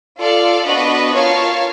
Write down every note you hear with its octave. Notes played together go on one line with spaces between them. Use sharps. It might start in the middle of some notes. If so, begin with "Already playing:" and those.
F4 A4 D5 F5
B3 D4 F#4 B4 D#5
F4 A#4 C#5 F5 A5